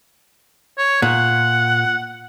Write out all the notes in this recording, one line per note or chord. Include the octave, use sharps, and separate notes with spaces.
C#5
A#2 F#5